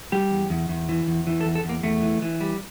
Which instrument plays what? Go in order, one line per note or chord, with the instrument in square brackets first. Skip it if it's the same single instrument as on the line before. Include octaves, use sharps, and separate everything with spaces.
[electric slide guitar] G3 G4
E2
E2
E2
E3
E2
E3
A4
E2
A4
E2 A#3
E2 A3
E3
E3
G3